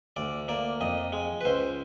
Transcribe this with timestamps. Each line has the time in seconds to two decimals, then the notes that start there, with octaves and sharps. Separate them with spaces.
0.16 D2 D5
0.48 A#3 D5
0.81 F2 D#5
1.12 G#3
1.41 B4
1.45 C#2 C5